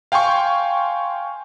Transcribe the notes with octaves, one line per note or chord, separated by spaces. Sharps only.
F5 G5 G#5 C6 C#6